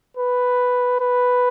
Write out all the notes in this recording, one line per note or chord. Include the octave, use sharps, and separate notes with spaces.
B4
B4